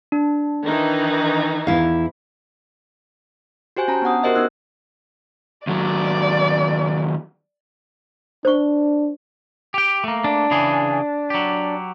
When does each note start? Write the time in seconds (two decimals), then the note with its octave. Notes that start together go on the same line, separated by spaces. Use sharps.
0.12 D4
0.65 D#3 E3 D#4
1.67 E2 E4 F5
3.77 F#4 G4 C5 G#5 G6
3.88 C#4 A5 A#5
4.02 B3 D4 F#5 D#6
4.23 F#4 G4 A#4 C5 D#5 E5
4.35 B3 C#4 D#4 E6 F#6
5.67 D#2 F#3 D5
8.45 D4 C5 C#6
9.74 G4 G5
10.04 A3 A#3
10.24 D4
10.51 C#3 E3 G#4
11.30 F#3 G4